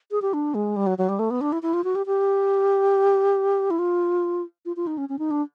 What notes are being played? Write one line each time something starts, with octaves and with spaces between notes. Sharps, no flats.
G#4
G4
D4
G#3
G3
F#3
F#3
G3
A3
B3
D4
E4
E4
F4
F#4
G4
G4
E4
F4
F4
F4
D#4
C#4
C#4
D#4
D4